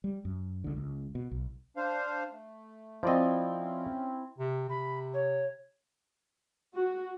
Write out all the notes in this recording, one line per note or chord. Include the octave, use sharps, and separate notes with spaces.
G3
F#2
C#2 D3
C#2
B2
B1
D4 C5 F5
A3
F3 C4 E4 D5 D#5
C#4
C3
C3 B5
C#5
F#4